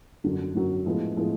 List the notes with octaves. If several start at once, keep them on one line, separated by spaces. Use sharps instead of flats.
F#2 D3 F#3
F#2 D3 F#3
A2 F3 G#3 B3
A2 F3 G#3 B3